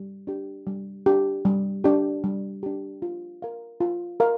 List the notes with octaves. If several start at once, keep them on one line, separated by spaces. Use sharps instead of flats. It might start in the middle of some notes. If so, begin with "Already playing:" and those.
Already playing: G3
D4 G4
G3
D4 G4
G3
D4 G4
G3
D4 G4
F4
A#4 F5
F4
A#4 F5